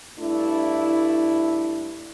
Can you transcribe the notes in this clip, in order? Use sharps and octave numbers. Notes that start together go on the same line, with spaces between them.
G2 A3 D4 E4